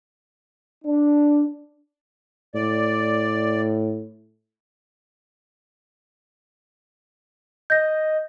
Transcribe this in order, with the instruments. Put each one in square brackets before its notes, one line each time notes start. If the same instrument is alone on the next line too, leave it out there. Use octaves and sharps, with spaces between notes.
[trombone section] D4
[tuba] A2 [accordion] D5
[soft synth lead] D#5 [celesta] G6 A#6